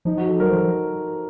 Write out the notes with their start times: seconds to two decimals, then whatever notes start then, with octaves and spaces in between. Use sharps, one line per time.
0.05 F3 D#4
0.17 F#4
0.29 A4
0.40 F#3 A#4
0.49 C5
0.52 F3